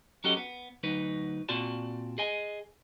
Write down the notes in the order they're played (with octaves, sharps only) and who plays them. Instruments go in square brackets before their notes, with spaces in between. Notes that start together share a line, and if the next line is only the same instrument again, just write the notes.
[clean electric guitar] F#3 C#4 F#4 G4 A4 D#5
B3
D2 F#3 D#4 B4
A#2 C4 F4 F#4 D5 A5
G#4 D#5 G#5